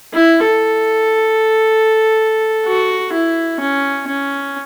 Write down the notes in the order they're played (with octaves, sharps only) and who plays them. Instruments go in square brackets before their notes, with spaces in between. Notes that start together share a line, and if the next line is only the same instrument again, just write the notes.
[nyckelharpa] E4
A4
F#4
E4
C#4
C#4